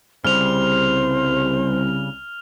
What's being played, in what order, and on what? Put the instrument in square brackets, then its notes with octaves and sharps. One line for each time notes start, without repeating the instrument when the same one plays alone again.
[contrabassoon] C2 [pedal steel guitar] C#3 G3 [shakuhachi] C5 [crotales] F6 F7